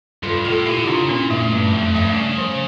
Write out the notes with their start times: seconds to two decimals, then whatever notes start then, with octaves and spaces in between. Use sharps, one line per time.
0.23 G2 F4 A4
0.44 A2 F4 A4
0.66 A#2 E4 G4
0.84 D3
0.87 C#3 D4 F4
1.09 A#2 C#4 E4
1.30 A#2 A3
1.52 G2 A3
1.73 F2 A3
1.95 G2 A3
2.10 D3
2.16 C#3 G3
2.38 F3